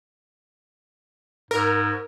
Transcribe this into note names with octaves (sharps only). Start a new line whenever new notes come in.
G#2 A#4